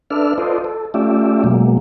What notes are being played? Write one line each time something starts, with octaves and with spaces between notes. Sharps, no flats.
D4 A4 B4 D5 E5 F6
F4 A4 B4 C5 D5 D#5
A4
A3 C#4 F4 G4 D5 E5
B2 F#3 G#3 A#3